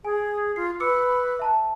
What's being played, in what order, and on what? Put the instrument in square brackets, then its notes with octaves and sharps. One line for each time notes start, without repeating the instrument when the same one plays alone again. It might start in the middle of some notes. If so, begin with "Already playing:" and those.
[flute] G#4 [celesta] G#5
[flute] F4 [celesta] C7
[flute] B4 [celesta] D6 E6 C#7
[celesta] E5 A5 A#5